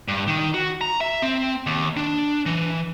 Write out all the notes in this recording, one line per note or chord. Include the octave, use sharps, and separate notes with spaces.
G2
D#3
F#4
A#5
E5
C4
D#2
D4
E3